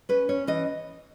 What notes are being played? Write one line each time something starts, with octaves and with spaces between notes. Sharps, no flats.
C#4 B4
C#4 C#5
E3 D#5